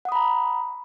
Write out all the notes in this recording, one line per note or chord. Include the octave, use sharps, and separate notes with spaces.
F#5 A#5 B5 D#6